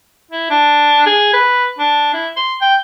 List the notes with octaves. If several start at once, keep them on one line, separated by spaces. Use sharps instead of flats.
E4
D4
G#4
B4
D4
E4
C6
G5